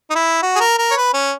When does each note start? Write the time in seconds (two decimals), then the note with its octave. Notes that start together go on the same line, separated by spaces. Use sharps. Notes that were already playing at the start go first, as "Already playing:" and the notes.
0.10 D#4
0.15 E4
0.42 F#4
0.56 G#4
0.60 A#4
0.78 A#4
0.91 C#5
0.96 B4
1.14 C#4